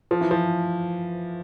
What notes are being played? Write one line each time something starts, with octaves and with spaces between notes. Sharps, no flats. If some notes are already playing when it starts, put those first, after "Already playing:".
F3
E3
F3